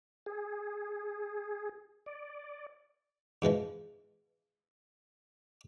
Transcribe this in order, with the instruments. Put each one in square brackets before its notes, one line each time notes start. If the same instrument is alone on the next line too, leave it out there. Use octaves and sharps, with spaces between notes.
[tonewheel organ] G#4
D5
[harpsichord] G#2 B2 E3 F3